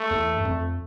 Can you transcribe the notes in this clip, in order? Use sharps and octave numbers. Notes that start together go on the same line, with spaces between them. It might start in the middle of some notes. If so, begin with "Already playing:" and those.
Already playing: A3
E2
G2
F2